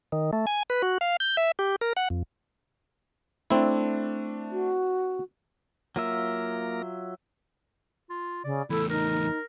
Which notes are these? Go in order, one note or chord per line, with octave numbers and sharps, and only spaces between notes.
D#3
A3
G#5
B4
F#4
F5
G6
E5
G4
A#4
F#5
F2
A3 C4 D4 E4
F#4
F#3 A#3 F4 A#4 E5
F4
C#3 D5
E2 A3 E4 A4
D#4 A#4